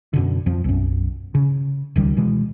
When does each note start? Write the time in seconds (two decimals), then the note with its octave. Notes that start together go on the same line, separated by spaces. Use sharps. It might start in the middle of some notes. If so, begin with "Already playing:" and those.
0.13 F#2 B2 D3
0.46 F2 F3
0.64 B1 F#2
1.35 C#3
1.96 D1 C#2 D#3 G3
2.17 B2 E3 G#3